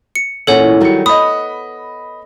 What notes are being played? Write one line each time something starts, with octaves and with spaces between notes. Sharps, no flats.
C#7
E2 A#2 C#4 A4 C#5 F#5
D#3 F#3 G3 C#7
B3 D#5 B5 D#6